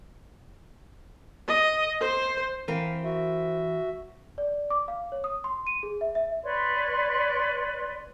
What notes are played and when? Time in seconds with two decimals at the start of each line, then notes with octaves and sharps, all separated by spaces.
1.48 D#5
2.01 C5
2.68 E3 C4 A#4 F5
3.04 F#4 E5
4.38 D5
4.70 D6
4.88 F5
5.12 C#5
5.24 D#6
5.44 C6
5.67 D#7
5.83 G#4
6.01 E5
6.15 E5
6.43 B4 C#5 D5 C6